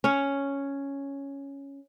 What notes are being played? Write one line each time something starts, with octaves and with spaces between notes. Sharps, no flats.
C#4 C#5